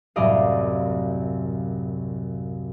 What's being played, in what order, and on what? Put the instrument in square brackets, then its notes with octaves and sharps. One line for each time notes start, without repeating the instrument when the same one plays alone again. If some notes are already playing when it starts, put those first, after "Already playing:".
[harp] C2 F#2 A2 D5 D#5 F5